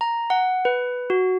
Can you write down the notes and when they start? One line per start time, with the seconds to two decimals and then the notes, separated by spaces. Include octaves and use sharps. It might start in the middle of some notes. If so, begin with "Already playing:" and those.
0.01 A#5
0.30 F#5
0.65 B4
1.10 F#4